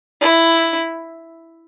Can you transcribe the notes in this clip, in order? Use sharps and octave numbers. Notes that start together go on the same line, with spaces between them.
E4